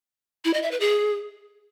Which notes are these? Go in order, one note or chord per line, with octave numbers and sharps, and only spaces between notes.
E4
D#5
E5
B4
G#4